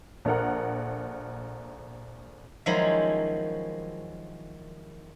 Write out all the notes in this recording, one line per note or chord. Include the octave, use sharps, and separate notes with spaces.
A#1 A4 A#4 F#5
D#3 F3 F#3 G#3 C#4 E4